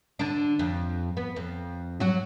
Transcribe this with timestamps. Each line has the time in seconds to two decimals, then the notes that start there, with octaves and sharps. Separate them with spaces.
0.19 D3 D4
0.59 F2
1.17 B3
1.36 F2
2.00 F#3 F#4